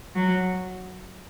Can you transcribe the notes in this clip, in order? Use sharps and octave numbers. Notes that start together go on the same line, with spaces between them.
F#3